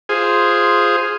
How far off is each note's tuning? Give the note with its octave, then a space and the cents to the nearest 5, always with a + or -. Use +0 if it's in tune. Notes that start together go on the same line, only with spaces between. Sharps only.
F4 +0 G#4 +0 C5 +0